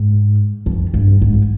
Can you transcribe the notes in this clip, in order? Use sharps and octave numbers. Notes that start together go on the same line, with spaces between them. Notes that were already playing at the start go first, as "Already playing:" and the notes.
Already playing: G#2
F2
G2
G#2